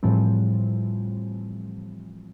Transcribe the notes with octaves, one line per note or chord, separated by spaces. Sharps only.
A2 E3 F3 G3 C4